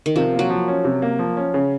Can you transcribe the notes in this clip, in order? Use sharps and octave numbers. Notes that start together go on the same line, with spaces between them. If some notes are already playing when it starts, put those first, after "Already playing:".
D#3
C3 F3
A#3
F#3
F3
C#4
C3
A#3
F3
C#4
C#3